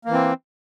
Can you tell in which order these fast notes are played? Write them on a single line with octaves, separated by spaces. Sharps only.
A#3 E3 C4